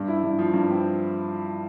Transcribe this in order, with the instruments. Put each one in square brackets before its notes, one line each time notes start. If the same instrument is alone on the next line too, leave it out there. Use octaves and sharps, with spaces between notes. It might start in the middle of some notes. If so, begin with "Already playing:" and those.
Already playing: [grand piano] G2
E4
G2
F3
G2
C4